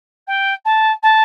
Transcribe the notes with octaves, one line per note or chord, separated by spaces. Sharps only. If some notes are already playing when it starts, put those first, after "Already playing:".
G5
A5
A5